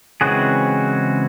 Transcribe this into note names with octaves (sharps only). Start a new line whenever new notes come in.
C#3 E3 G#3 C4 F#4 G#4